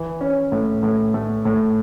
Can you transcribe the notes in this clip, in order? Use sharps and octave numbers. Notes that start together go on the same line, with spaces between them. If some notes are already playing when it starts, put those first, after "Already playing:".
Already playing: E3
C#4
A2
A2
A3
A2